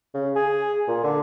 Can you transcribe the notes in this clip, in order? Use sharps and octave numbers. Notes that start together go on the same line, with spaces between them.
C#3
G#4
A#2
D3